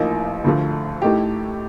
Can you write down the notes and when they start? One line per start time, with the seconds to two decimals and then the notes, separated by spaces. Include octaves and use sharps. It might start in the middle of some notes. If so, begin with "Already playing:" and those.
Already playing: A1 A2 F3 A#3 D#4
0.44 D2 D3 F3 A3
1.02 A2 A3 D#4 G4